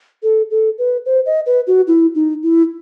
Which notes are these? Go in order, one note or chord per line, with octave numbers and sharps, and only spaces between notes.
A4
A4
B4
C5
D#5
B4
F#4
E4
D#4
E4